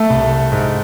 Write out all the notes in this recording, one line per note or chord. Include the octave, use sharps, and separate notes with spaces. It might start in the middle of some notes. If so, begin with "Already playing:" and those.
Already playing: A3 A4
C2
G#2